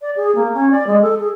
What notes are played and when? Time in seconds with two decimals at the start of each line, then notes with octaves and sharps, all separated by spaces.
0.01 D5
0.16 G#4
0.35 A#3
0.54 C#4
0.71 D5
0.87 G#3
1.01 A4
1.19 G#4